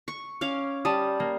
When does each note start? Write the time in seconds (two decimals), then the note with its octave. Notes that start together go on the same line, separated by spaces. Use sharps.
0.08 C#6
0.41 C#4 F5 D6
0.85 G3 A5 D#6
1.20 A#3